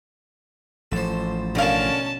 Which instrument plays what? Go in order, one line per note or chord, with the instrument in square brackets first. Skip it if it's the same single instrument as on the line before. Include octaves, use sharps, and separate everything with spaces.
[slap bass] A1 F3 [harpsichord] A4 C5
[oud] B2 F5 [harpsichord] D3 D4 A#4 [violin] C#4 A5